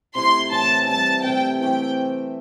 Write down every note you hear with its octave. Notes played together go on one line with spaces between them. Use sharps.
C3 A3 E4 C6
A2 E3 C4 A5
G3 C4 E4 A5
C3 A3 C4 G5
E3 A3 C4 G4 G5